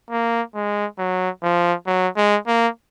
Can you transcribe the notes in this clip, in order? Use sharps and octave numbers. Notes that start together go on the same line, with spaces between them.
A#3
G#3
F#3
F3
F#3
G#3
A#3